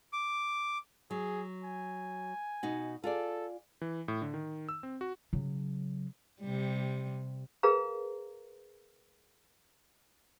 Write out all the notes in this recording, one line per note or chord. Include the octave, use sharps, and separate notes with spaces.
D6
F#3 G#4
G#5
B2 D#4 F#4
F4 G#4 A4 D5
E3
A2
D3
D#3
E6
C4
F#4
C#3 F#3
C3 G3
G#4 A#4 B4 F5 A#5